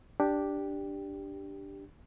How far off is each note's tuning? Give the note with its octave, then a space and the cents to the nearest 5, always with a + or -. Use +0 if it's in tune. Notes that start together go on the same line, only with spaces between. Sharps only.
D4 +0 G4 +0